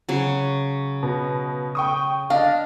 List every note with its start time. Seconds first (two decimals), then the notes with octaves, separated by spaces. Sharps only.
0.09 C#3 F#3
1.03 B2
1.75 G5 C#6 D#6
2.30 D4 D#5 F5